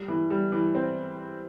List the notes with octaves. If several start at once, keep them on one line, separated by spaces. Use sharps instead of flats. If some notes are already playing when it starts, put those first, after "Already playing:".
Already playing: G3
E3
G3
E3
C4